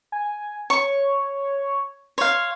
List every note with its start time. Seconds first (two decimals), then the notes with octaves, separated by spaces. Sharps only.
0.12 G#5
0.70 C#5 C#6
2.18 C#5 F5 C6